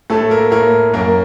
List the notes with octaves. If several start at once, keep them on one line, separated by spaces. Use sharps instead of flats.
A2 A3 A4
A#3 A#4
A2 A#3 A#4
F#2 A#3 A#4